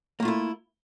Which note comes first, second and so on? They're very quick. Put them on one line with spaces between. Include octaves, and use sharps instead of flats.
A#3 A3 F4 E4